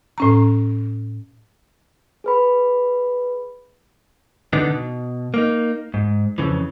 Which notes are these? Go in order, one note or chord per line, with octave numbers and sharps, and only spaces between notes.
A2 C#4 A#5
G#4 B4 B5
D3 B3 D4 D#4
B2
A#3 D#4
G#2
F2 A#2 C#3 E3